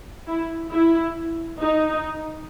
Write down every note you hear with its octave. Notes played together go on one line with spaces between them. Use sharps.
E4
E4
D#4